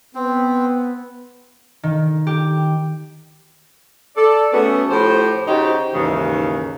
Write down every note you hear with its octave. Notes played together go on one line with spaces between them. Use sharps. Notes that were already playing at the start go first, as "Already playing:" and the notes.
B3 C4
D#3
G4
A4 D5
A3 B3 C#4 F#4 G#4
A2 F3 G4 C5
C#3 D#4 F#4 G4 C5
D#2 G#2 C#3 E3